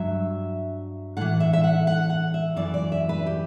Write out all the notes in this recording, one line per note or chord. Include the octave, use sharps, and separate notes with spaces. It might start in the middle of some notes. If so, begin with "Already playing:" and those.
Already playing: G2 F#3 E5
A2 E3 F#5
E5
E5
F#5
F#5
F#5
E5
F#2 E3 D5
D5
E5
B4
G4